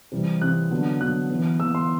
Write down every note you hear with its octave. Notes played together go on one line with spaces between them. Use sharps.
C3 E3 G3 C4
C3 E3 G3 C4 F#6
D3 F#3 B3
D3 F#3 B3 F#6
E3 B3
E3 B3 E6
C6